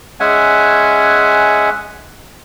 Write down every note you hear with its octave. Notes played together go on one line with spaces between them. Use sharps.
G#3 C#4 E5 F#5 G#5